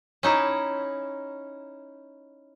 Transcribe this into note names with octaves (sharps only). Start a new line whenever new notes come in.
C#4 D#4 E4